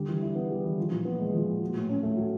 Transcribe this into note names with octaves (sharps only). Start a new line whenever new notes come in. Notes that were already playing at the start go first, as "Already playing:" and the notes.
Already playing: D3 G3
E3
E4
B3
G3
E3
F3
A#2
B3
G#3
F3
A#2
F#3
A2
C#4
A3
F#3